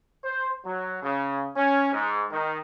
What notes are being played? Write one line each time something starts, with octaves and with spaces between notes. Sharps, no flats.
C5
F#3
C#3
C#4
G#2
D#3